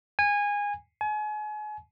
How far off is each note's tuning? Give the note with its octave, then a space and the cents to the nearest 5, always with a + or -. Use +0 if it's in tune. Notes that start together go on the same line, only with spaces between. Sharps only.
G#5 -20
G#5 +35